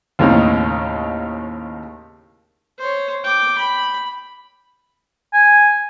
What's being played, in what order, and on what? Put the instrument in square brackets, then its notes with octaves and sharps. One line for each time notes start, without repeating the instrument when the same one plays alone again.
[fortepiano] D#2 A2 C#3 C4 D#4
[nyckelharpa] C5 C#5
G5 D6
B5
[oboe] G#5